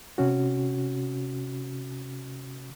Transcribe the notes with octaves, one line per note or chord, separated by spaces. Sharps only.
C3 C#4 F#4